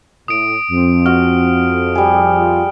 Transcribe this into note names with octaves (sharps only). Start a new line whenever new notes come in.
A2 D#6 D7
F2 C4
F#4 F6
G3 G#4
F4